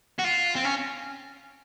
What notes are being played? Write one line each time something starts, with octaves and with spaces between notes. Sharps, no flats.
F#4
F4
C4
C#4